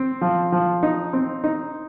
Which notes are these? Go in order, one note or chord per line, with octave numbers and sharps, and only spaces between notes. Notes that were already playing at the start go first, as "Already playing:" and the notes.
Already playing: C4
F3
F3
D#4
C4
D#4